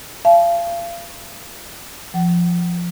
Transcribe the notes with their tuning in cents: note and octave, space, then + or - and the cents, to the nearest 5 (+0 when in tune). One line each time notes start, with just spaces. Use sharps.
F5 -35 A5 -35
F3 +0 F#5 +40